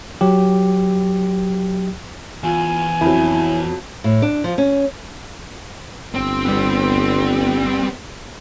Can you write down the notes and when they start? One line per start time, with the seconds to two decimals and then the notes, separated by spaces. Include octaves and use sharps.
0.21 F#3 G4
2.43 E2 F4 G#5
3.01 F2 F#3 E4
4.04 A2
4.22 D4
4.44 F3
4.58 C#4
6.15 G1 C4
6.45 G3 B3